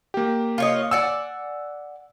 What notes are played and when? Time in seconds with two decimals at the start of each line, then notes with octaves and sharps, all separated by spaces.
0.14 A#3 G4
0.58 F4 C#5 D#5
0.91 D5 F#5 G#5 E6